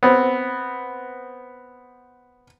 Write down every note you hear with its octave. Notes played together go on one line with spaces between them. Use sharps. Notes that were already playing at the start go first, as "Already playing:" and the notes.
B3 C4